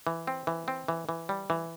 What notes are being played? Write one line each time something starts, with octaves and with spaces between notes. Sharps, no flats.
E3
C4
E3
C4
E3
E3
G3
E3